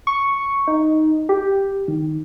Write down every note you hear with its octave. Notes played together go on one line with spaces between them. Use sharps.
C#6
D#4
G4
D#3